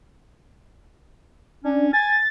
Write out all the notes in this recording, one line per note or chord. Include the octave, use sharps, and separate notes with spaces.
C#4 D4
G#5 A6